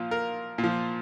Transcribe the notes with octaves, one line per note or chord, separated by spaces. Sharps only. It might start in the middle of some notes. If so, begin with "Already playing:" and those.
Already playing: A#2 F3 F4
A#4
A#2
F3